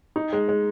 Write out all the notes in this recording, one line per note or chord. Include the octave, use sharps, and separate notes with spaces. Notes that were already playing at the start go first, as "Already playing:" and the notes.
D#4
G#3
G#3